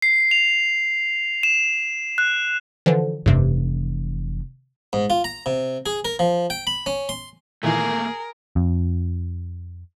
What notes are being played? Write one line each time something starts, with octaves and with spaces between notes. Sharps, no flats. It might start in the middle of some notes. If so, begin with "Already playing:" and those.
C7
F7
E7
F#6
D3 E3 F3
F1 G2 C3 E3
G#2
F4
A#5
C3
G#4
A#4
F3
G5
B5
C#4
C6
A#2 D#3 E3 A3 A#3 G#4 A#4
F2